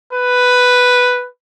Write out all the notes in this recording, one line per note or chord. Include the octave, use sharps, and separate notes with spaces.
B4